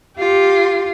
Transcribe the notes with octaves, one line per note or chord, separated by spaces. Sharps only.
F4 G4